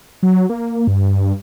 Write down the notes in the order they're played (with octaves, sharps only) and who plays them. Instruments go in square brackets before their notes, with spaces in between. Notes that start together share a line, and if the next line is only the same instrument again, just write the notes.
[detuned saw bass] F#3
A#3
G2